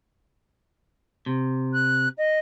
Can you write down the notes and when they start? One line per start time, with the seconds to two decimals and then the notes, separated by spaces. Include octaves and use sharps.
1.26 C3
1.73 F#6
2.18 D#5